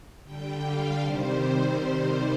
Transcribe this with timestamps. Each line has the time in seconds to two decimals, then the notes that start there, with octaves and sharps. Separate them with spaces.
0.24 D3 G3 G5
0.62 F5
1.00 C3 D#3 G3 C5